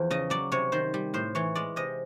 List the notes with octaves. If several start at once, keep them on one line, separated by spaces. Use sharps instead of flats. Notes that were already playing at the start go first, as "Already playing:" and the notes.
Already playing: E2 F3
C#3 D#5
F#3 D5
C3 C#5
D#3 C5
G3
A2 C5
E3 C#5
G#3 D5
C3 D#5